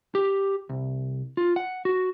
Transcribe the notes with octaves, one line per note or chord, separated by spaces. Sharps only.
G4
C2
F4
F#5
F#4